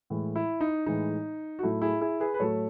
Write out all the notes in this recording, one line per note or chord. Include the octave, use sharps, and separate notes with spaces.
A2 E3 G#3
E4
D#4
A2 E3 G#3 D#4
F#4
A2 F#3 A3 E4
E4 G#4
E4 G#4
G#4 B4
B4
A2 F#3 A3 A4 C#5